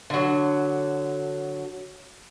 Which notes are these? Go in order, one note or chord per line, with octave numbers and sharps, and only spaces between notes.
D3 F#3